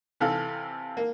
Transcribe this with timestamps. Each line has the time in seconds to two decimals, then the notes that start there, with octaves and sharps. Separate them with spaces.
0.20 C3 E3 A4 F5
0.97 A#3